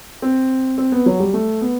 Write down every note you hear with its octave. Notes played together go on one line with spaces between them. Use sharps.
C4
C4
B3
F#3
G3
A3
B3